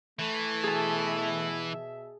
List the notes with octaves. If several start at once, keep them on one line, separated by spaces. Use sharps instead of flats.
E3 A3
B2 G#4 E5 A5